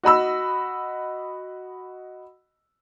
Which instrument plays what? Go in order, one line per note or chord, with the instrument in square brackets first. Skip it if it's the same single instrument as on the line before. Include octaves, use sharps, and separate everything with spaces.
[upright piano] F#4 D#5 B5 E6